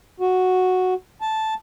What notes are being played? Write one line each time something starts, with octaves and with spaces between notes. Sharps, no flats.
F#4
A5